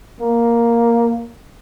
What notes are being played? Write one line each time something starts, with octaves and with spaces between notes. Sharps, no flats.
A#3